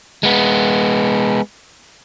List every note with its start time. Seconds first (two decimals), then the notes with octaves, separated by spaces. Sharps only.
0.23 G#3 B3